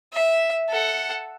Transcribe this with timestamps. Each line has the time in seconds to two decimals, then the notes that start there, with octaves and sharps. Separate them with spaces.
0.13 E5
0.70 A4 F#5